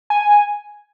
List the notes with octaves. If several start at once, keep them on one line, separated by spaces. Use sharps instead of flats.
G#5